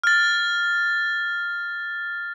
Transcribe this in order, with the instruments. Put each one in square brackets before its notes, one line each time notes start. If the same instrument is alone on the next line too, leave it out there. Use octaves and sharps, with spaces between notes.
[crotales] F6 A6